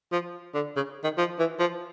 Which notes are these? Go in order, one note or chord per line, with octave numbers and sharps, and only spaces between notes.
F3
D3
C#3
D#3
F3
E3
F3